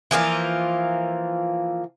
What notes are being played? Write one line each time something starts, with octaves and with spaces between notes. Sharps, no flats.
E3 F3 A#3 F4